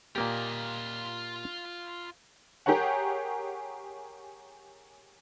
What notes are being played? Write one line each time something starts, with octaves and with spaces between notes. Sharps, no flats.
A#2 A#3 F4 G4 D#5
G4 G#4 A#4 C#5 F#5